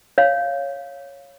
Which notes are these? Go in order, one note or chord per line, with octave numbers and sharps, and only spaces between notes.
C#5 F5